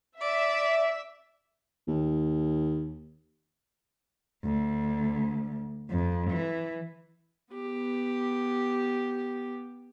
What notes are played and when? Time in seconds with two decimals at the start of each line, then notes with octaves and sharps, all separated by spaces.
0.21 D5 E5
1.88 D#2
4.44 D2
5.90 F2
6.30 E3
7.53 B3 G4